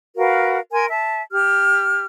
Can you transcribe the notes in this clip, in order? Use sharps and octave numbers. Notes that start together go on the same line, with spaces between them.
F#4 A#4 B4 F5
A#4 G#5 C6
E5 A5
G4 F6